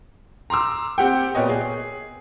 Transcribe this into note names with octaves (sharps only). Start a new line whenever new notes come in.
A#5 C6 D6 E6
C4 G4 F#5 G5
A#2 B3 C#5 D#5 G5
G#4